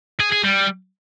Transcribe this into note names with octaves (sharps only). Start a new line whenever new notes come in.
G#4
G#4
G3